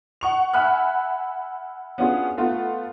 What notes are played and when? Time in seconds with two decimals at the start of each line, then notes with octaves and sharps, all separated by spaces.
0.21 F#5 C#6 F7
0.53 E5 F#5 G#5 B5 F6 F#6
1.98 B3 C#4 D4 F4 F#4 G#4
2.38 A3 B3 F4